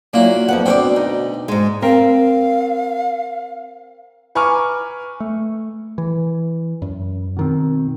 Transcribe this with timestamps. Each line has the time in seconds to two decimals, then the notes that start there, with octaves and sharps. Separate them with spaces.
0.13 A#2 F#3 A#3 E4
0.48 F2 B3 F#5
0.66 D2 B2 C4 C#5 D5 G5
0.96 D#4
1.48 G#2 G#3
1.82 C4 A#4 F5
4.35 B4 G#5 A#5 C#6 D6 F6
5.20 A3
5.98 E3
6.82 F#2
7.37 B2 D#3 C4